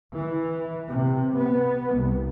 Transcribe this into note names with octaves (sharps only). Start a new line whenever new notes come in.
E3
C3
B3
C2